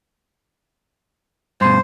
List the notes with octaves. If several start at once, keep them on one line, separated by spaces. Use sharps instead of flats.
G2 B2 C5